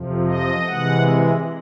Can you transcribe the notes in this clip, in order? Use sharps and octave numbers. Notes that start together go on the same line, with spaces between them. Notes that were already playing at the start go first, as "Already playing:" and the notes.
Already playing: F2 C3 F3
D#5
C3 E3 G#3 F#5